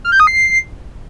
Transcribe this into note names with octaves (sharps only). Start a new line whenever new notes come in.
F6
G6
D#6
C7